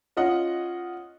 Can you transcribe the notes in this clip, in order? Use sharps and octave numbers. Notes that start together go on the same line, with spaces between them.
C#4 F4 D#5 F#5